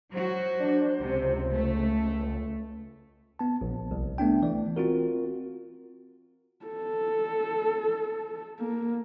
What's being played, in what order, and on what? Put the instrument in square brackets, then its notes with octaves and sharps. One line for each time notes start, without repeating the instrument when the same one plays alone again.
[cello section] F#3 F#4 [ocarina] C5
[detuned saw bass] D4
[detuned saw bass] C#2 [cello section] C3
[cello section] A3
[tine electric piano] B3 A5
A#1
C2
A3 B3 D4 G5
E3 D5
C4 F4 F#4 A#4
[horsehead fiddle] A4
A#3